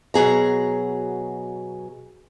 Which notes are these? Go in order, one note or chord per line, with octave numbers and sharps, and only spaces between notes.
B2 F#3 G#4 A#5